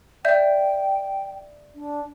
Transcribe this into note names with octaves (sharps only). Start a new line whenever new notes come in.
D5 E5 G5 G6
D4